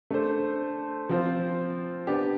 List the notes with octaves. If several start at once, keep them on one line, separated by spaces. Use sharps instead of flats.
A3 D4 A4 C5
F3 C4 F4 C5
B3 D4 G4